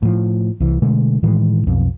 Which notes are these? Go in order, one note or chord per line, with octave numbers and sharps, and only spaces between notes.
A2 F3
C2 E3
B2 D3 G#3 A3
A2 D#3 E3 G#3
B1 F2